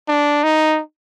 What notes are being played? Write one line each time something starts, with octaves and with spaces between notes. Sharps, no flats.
D4
D#4